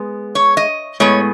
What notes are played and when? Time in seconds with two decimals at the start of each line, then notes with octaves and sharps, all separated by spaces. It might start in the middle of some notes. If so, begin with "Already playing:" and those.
Already playing: G#3 B3
0.35 C#5
0.57 D#5
1.00 A2 G#3 B3 C#5